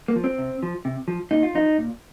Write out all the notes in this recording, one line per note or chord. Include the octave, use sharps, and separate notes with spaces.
A#3
F3
C4
C3
F3
C3
F3
A#2 D#4
F4
F3 D#4
A#2